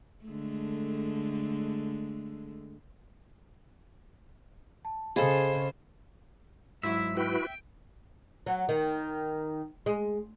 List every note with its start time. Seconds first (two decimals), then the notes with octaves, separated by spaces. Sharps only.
0.25 D3 G#3 A3
4.85 A5
5.16 C#3 G#4 A4 C5 D#5 F5 B5
6.83 G#2 F#3 E4 E5
7.17 E4 F#4 B4 G5
8.46 F#3
8.69 D#3
9.86 G#3